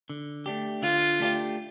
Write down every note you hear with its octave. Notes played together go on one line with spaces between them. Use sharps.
D3
A3 D4 G4
D3 F4
A3 D4 G4